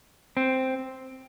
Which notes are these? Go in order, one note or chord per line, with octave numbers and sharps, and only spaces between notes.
C4